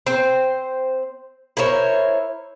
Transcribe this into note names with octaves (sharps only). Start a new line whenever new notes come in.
C4 C5
E4 A#4 C5 C#5